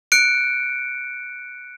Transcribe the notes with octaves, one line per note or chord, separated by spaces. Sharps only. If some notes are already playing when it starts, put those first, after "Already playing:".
F#6 C#7 D7